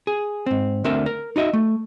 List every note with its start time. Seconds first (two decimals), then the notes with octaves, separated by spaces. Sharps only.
0.07 G#4
0.46 G#2 C4
0.84 D2 D3 C4 A#4 E5
1.06 A#4
1.36 D#4 F#4 D#5 E5
1.53 A3